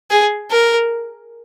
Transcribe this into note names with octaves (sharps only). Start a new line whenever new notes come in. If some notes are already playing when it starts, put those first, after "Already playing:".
G#4
A#4